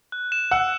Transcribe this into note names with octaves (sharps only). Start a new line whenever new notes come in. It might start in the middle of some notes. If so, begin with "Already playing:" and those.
F#6
E7
F#5 E6